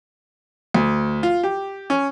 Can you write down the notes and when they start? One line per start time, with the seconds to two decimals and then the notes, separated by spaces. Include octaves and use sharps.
0.74 D2
1.23 F4
1.43 G4
1.90 C#4